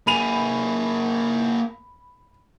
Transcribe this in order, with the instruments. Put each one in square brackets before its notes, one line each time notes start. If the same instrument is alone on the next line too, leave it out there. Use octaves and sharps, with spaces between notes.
[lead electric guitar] A#3 G#4 [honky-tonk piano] B5 D#7 F7